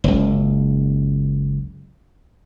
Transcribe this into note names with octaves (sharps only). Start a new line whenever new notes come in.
F#1 C#2